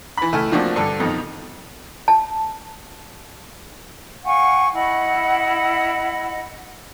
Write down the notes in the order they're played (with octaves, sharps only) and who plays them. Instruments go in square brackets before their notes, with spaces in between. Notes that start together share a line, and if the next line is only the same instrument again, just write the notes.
[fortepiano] E3 B5
C#2 A3 E4 G#5 F6
F3 A3 A#3 C4 D4 F#4
G2 D3 A4
F2 B2 D#3
[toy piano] A5
[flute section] F5 F#5 G#5 C#6
E4 D#5 F#5 B5